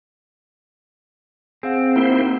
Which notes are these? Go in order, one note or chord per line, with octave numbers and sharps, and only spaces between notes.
C4 G#4 F5 F#5
A#3 E4 C5
D#4 G4